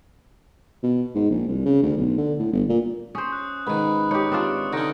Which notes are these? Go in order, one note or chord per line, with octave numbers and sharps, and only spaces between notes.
B2
G#2
A#1
C2
C#3
D2
B1
D3
A2
G1
A#2
C#4 C5 D#6
F#6
G#2 D#3 B4
D#4 G4 C#5 D6 D#6 F#6 C#7
C4 D4 F4 D#6 F6 F#6
D3 C#4 D#4 A4 D#6 A#6 D7